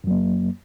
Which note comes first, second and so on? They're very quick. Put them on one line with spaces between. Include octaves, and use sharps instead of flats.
F#2 F#3 A#3